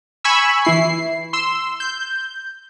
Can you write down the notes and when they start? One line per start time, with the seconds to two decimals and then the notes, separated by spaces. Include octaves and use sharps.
0.24 G#5 B5 C#6 E6
0.65 E3 E4 C7
1.33 C6 E6
1.80 G6